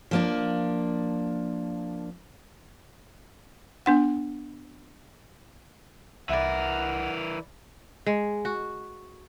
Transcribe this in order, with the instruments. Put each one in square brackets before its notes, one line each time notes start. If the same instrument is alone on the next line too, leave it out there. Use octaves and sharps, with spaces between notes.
[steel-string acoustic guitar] F3 A#3 D4
[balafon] B3 D4 F#5
[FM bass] C2 [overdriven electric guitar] E3 A#4 [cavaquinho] E4 D5 [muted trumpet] F#5
[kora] G#3
F#4